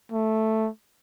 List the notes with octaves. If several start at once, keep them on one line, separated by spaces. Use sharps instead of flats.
A3